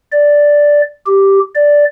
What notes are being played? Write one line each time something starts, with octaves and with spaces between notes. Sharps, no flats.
D5
G4
D5